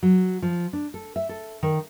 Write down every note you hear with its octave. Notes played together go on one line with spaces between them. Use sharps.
F#3
F3
D4
A4
E5
A4
D#3